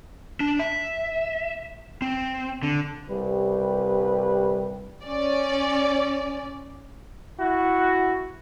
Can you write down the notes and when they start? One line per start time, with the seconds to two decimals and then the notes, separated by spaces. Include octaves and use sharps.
0.40 D4
0.59 E5
2.02 C4
2.63 D3
3.10 C2 G3 G4 B4
5.04 C#4 D5
7.38 E4 F#4